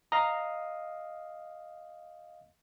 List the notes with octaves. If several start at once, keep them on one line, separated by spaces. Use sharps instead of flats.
D#5 F5 A#5